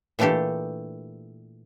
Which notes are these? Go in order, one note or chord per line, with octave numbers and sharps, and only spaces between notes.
A#2 E3 A3 D4 G4 A4